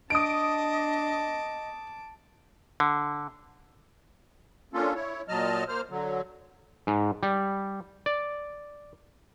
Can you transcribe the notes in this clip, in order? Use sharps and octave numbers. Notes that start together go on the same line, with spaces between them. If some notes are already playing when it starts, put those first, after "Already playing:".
D4 D#5 A5 D6 D#6 D7
D3
A#3 C#4 D4 F4 A4
E4 C#5
A#2 F#3 D#5 A5 F6
A#3 C5 F6
D3 F#3
G#2
G3
D5